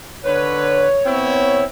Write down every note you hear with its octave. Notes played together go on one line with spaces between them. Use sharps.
D3 B4 C#5
B3 C4 E4